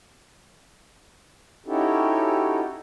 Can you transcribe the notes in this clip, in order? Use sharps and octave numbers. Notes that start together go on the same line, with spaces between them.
C#4 D#4 E4 F#4 G4 A4